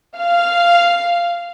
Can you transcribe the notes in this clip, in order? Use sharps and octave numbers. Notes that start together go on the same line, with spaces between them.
F5